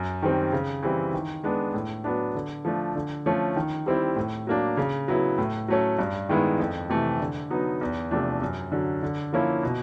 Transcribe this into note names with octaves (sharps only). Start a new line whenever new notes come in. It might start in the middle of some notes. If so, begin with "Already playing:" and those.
Already playing: F#2
D#3 G3 C4
C#3
E3 G3 C4 E4
D#3
G#3 B3 D4
A2
F#3 B3 D4
D3
F3 A3 D4
D3
F3 A3 C#4
D#3
G3 C4 E4
A2
F#3 A#3 D4
C#3
F#3 B3 E4
A2
F#3 A3 C#4
G2
D#3 G#3 B3 E4
F2
C3 E3 A3
D3
F#3 B3 D#4
E2
C3 F3 A3 D4
F#2
D3 F#3
D3
F3 A#3 C#4 E4
B2